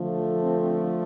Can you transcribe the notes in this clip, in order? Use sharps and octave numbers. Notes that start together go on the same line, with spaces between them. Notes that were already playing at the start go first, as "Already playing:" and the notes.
Already playing: D3 F3 A3
C4